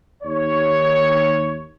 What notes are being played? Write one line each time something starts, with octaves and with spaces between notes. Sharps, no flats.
D#2 C#5